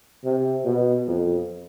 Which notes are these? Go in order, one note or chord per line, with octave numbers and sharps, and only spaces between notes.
C3
B2
F2